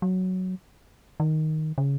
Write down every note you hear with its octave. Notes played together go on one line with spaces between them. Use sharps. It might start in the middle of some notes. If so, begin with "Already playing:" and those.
F#3
D#3
C#3